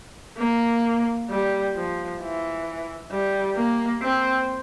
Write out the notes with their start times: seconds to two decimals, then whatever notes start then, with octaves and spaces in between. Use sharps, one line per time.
0.38 A#3
1.30 G3
1.75 F3
2.21 E3
3.11 G3
3.56 A#3
4.02 C4